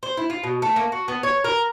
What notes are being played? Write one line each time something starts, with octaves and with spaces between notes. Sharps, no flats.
C5
E4
F4
B2
A3
A#3
F#4
B3
C#5
A#4